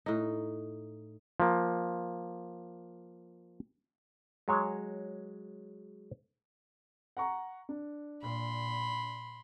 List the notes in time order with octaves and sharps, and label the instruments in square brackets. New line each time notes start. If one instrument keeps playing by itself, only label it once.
[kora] A2 D#4
[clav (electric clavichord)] F3 A#3
F#3 G#3 C#5
[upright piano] F#5 A#5 C#6
D4
[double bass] A#2 [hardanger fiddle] B5 C6